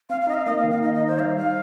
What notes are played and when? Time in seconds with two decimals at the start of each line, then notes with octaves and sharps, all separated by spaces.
0.10 C4 F5
0.21 F5
0.27 D#4 D#5
0.34 F5
0.46 A#3 D#5
0.58 F5
0.64 D#3
0.71 F5
0.82 D#4 D#5
0.94 D#5
1.01 D#4
1.07 C5
1.18 G3 F5
1.37 G3 F5